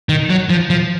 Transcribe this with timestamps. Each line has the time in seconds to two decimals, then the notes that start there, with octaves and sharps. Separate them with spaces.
0.09 D#3
0.30 F#3
0.50 F3
0.70 F3